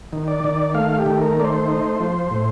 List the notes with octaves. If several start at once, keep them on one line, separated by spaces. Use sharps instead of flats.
D#3
D5
D#3
A3 F5
G4
D#3
A#4
A3 D5
C5
D#4
F3
A2